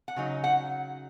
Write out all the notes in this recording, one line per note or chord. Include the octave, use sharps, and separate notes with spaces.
F#5
C#3 F#3 D#4
F#5